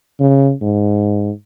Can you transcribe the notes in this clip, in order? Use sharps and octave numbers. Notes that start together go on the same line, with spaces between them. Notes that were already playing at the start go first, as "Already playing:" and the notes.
C#3
G#2